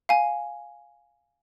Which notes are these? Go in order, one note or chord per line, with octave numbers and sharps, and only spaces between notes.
F5 G#5